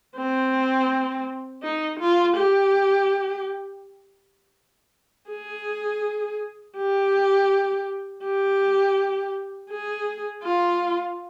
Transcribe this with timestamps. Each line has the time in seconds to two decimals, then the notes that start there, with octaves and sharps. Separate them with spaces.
0.17 C4
1.63 D#4
2.00 F4
2.37 G4
5.30 G#4
6.77 G4
8.24 G4
9.70 G#4
10.43 F4